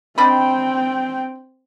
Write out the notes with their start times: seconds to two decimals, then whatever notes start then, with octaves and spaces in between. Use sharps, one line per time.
0.18 C4 D4 D#5 G5 B5